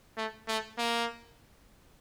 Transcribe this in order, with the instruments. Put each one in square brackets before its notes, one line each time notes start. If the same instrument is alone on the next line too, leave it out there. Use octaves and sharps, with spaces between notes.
[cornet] A3
A3
A#3